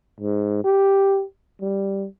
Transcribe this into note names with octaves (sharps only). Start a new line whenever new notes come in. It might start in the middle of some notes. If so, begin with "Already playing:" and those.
G#2
G4
G3